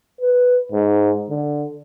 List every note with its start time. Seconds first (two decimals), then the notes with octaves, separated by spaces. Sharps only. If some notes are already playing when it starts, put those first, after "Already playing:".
0.21 B4
0.72 G#2
1.30 D3